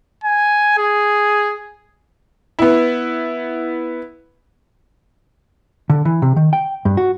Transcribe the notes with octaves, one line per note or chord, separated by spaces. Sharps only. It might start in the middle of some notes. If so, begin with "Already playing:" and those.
G#5
G#4
B3 E4
D3
E3
C3
D#3
G5
G2
F#4